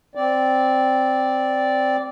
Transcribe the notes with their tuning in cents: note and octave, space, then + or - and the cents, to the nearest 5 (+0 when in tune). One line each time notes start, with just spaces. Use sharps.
C4 +0 D5 -5